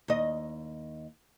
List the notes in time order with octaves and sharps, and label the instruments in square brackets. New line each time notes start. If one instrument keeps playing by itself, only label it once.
[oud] D#2 D#5